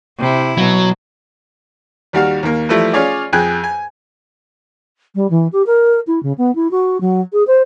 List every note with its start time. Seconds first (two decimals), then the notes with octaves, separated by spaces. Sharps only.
0.19 C3 E4
0.58 B2 F#3
2.13 D#2 G3 F#4 F5
2.43 D#2 A#3
2.69 E3 F3 G3 A3 E4
2.93 C#4 F4 G#4 C#5 D5
3.33 F2 G#4 G5 G#5 F#6
3.64 G#5
5.15 G3
5.30 E3
5.53 G4
5.66 A#4
6.07 E4
6.23 C#3
6.38 B3
6.55 E4
6.71 F#4
7.01 F#3
7.33 G#4
7.47 C5